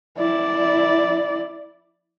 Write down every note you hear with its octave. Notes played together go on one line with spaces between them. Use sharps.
E4 D5